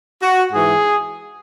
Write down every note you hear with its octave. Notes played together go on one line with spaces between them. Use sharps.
F#4
G#2 E3 G#4